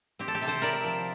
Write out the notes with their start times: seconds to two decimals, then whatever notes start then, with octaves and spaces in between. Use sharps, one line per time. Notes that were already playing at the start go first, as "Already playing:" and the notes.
0.19 C4 G4
0.28 A4
0.35 G4
0.42 C3
0.47 A4 C5
0.62 E4 A#4 D5
0.84 F3